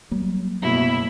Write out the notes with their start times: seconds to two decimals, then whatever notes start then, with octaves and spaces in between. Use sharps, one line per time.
0.11 F#3 G3 A#3
0.62 F#1 B2 E4